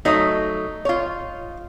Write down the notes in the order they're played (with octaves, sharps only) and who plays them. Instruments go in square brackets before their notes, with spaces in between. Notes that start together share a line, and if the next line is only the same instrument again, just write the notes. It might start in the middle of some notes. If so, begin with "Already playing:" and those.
[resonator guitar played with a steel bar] F#3 A3 [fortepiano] D#4 D#6
[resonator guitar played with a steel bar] F4 C#5